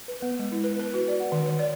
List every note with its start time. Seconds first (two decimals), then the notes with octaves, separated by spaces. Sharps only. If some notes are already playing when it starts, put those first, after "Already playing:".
0.08 B4
0.22 B3
0.39 G#3
0.52 E4
0.64 B4
0.80 B4
0.94 F#4
1.08 D5
1.20 F#5
1.32 D#3
1.46 C#5
1.59 D5